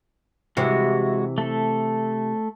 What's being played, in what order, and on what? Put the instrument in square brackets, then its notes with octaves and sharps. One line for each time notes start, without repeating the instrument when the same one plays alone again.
[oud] C3 E3 G4 [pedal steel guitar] G#3 F#4
[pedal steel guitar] A3 A4